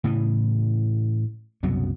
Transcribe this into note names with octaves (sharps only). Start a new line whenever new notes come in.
A2 C#3 E3
C2 F#2 B2 F#3